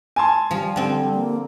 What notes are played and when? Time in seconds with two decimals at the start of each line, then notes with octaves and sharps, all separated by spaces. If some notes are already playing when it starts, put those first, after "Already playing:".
0.16 G#5 A5 C6
0.51 F3 G3
0.76 D3 C4
1.14 A#3